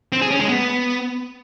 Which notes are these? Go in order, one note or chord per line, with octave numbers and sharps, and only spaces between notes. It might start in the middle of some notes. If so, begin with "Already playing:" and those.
C4
G#4
C#4
G#3
B3